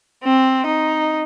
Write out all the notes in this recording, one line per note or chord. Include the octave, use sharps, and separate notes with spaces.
C4
D#4